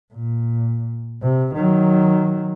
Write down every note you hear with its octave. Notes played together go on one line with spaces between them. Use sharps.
A#2
C3
D#3 F#3